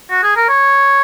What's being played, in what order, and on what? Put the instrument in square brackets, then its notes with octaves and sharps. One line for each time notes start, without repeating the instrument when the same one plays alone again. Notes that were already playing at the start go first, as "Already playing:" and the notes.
[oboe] F#4
G#4
A#4
C#5